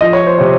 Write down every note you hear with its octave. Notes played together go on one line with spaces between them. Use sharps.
F3 D#5
C#5
C5
C3 C#5